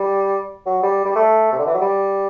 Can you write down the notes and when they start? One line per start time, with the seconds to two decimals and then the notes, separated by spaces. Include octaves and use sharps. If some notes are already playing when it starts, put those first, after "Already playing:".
Already playing: G3
0.66 F#3
0.83 G3
1.05 G3
1.15 A3
1.52 C3
1.59 D3
1.67 E3
1.74 F#3
1.81 G3